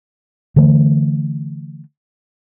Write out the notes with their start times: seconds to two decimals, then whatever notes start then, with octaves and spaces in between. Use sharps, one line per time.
0.56 D3 E3 A3